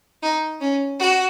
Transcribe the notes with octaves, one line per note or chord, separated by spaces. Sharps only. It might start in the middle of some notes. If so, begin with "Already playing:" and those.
D#4
C#4
F#4